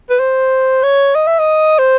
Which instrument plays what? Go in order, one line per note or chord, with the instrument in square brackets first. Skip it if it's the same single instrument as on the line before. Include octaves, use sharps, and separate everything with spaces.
[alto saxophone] B4
C5
C#5
D#5
E5
D#5
C5